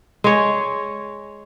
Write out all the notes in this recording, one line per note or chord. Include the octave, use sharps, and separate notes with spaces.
G#3 C#5